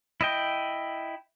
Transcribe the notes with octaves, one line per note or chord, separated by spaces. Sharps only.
E4 D#5 G5